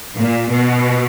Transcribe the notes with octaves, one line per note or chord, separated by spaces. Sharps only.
A#2
B2